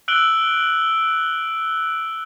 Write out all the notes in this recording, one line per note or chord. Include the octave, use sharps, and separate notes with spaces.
E6 F#6 D7 F#7 G7